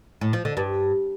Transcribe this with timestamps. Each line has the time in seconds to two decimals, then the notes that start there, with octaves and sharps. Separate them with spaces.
0.21 A2
0.33 F3
0.45 D3
0.57 G2